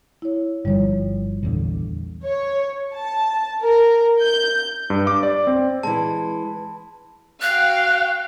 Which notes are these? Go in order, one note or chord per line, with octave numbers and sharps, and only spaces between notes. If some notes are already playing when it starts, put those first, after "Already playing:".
E4 C#5
G1 D3 F3 G3 C#5
A#1 E2 D3
C#5
A5
A#4
G6
G2
D6
D5
C4
E3 G#3 A5
F#4 F5 G5 F#6